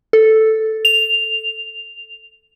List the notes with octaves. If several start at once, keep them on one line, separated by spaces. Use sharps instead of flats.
A4
F7